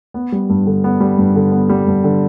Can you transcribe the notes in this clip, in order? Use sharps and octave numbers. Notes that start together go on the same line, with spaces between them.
B3
G3
G2
D3
B3
G3
G2
D3
B3
G3
G2
D3